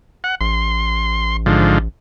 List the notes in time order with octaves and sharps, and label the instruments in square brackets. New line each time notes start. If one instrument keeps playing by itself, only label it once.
[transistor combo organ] F#5
[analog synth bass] A1 [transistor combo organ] C6
[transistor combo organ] G#2 D3 F3